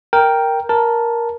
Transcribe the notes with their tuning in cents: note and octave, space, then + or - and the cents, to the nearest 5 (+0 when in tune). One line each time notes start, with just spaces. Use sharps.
A#4 +0 G5 +0
A#4 +10 A5 +0